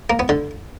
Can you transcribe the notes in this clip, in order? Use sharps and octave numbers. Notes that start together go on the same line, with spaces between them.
A#3
B3
D3